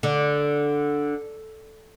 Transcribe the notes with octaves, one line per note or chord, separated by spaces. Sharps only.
D3